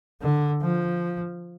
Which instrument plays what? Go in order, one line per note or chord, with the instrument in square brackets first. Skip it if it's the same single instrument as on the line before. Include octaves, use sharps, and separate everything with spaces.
[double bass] D3
F3